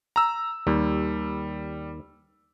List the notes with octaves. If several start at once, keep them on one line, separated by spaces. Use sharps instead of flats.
A#5 E6
D#2 G3